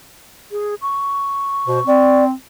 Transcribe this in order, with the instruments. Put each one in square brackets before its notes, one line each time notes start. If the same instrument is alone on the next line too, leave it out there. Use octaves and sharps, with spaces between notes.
[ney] G#4
C#6
[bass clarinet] B2 [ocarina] C5
[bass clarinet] C4 [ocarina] D5